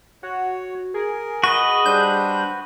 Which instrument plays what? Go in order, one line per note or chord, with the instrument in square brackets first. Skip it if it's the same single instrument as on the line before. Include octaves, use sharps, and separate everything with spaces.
[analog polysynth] F#4 [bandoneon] C#5
[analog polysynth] G#4 [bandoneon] A#4
[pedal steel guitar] F#4 B4 D#5 [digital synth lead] C#6
[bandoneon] G3 D4 C5 [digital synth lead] G6